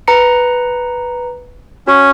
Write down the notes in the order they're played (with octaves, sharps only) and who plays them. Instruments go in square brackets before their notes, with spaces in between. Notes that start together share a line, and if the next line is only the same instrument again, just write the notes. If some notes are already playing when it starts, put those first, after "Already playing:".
[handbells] B4 A#5 C#7
[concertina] C#4 [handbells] F#4